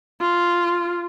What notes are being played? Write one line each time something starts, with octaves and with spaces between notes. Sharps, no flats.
F4